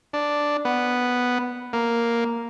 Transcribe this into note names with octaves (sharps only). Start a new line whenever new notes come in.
D4
B3
A#3